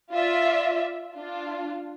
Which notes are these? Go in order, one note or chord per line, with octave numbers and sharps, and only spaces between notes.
F4 D5 E5
D4 F4